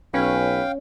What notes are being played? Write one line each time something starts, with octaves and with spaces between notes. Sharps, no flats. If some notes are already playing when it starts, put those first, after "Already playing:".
B1 C#4 B4 F5 G5